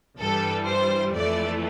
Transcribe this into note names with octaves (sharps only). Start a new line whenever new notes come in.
G2 E3 G3 A4
C5
F2 E3 A3 D5